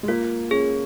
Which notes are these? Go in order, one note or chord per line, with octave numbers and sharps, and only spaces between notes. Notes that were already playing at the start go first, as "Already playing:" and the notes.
G#3
A#3 F4
C#4 G#4